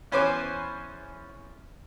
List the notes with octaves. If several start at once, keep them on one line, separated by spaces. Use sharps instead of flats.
E2 C#4 B4 C5 G#5 D6